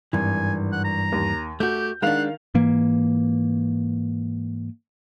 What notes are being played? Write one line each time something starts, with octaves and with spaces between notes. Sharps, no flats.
G#1 G2 E3 G#5
F#5
A#5
D#2
A3 F#4 G4 G6
D#3 G#3 D4 F5 F#5 F7
G#2 E3 A#3